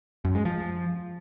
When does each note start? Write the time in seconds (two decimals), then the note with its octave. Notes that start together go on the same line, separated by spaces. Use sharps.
0.25 F#2
0.35 G#3
0.45 F3